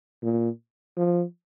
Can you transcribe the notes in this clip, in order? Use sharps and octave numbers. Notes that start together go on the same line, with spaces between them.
A#2
F3